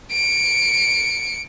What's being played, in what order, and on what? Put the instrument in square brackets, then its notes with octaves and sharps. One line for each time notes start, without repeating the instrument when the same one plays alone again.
[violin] C#7 D7